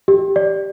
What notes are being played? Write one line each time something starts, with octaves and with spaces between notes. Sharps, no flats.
G4
D5